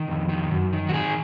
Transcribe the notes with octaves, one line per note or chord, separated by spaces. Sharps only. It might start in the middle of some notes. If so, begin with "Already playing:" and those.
Already playing: D#3
F2
D#3
F#2
D#3
F#4
D#3 G#4